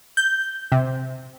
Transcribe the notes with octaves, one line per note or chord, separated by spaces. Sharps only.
G6
C3